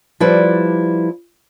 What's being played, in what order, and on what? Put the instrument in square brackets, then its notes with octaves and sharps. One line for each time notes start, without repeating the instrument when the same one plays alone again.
[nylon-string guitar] F3 G3 E4 B4 D5